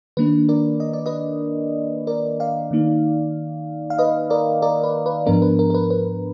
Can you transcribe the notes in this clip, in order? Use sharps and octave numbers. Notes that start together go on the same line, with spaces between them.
D#3 A#3 D4 B4
A#4 D5
D#5
D5
B4 D#5
A#4 D5
D5 F5
D#3 A#3 D#4
F5
B4 D#5
A#4 D5
A#4 D5
B4
B4
G#2 F3 B3 D4 A#4
B4
A#4
A#4
B4
B4